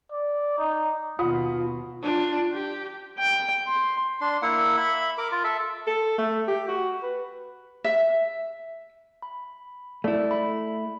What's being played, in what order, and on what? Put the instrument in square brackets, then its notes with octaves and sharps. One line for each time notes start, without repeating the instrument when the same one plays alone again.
[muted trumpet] D5
D#4
[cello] D#2 B2 [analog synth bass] F4 [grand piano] F#5 B5 D#6
[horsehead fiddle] D4 F4
G4
[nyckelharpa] G5
C6
[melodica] D4 C6
A#3 E4 F#5
E5 B5
A#4 D6
F4
A4 E5
[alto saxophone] A4
A3
G4
F#4
B4
[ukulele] E5
[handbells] B5
[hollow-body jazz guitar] A3 E4 [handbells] D5
[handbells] B5